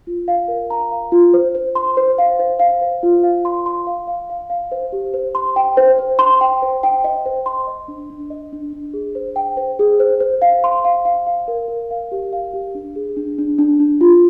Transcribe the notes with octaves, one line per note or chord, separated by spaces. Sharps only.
F4
F5
A#4
A#5
F5
F4
C5
C5
C6
C5
F5
C5
F5
C5
F4
F5
C6
C6
F5
F5
F5
F5
C5
G4
C5
C6
G5
C5
C5
C6
G5
C5
G5
D#5
C5
C6
D#5
D4
D4
D#5
D4
D4
G#4
C5
G5
C5
G#4
C5
C5
F5
C6
F5
F5
F5
A#4
A#4
F5
G4
F5
G4
D4
G#4
D4
D4
D4
D4
F4